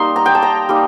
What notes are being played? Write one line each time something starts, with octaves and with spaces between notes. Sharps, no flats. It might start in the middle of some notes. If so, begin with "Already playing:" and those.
Already playing: G3 A#3 D#4 C6
A#5
G5
A5
A#5
G3 A#3 D#4